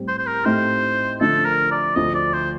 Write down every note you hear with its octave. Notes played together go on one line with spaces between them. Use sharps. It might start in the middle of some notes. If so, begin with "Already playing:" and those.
Already playing: A2 G3 C4 G4
C5
C5
A#4
A2 A3 C4 D#4 G4 C5
D3 F3 A3 D4 A4
A#4
D5
D2 D3 F3 D#5
D5
C5